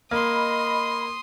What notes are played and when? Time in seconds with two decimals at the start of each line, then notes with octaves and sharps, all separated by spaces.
0.11 A#3 D#5 B5 C6 D#6